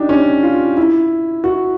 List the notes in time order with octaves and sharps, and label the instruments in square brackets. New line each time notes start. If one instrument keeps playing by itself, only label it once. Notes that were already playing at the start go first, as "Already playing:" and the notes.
Already playing: [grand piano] D4 D#4 G4
C#4
F4
E4
F#4